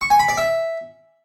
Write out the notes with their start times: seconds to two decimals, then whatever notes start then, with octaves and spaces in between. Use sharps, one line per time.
0.01 C#6
0.10 G#5
0.19 B5
0.29 D5
0.38 E5